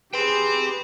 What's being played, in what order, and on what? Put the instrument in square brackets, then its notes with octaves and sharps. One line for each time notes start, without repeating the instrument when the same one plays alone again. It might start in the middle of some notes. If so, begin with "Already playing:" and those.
[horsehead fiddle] G4 [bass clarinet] G#4 [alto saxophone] B4 [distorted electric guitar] G5 C6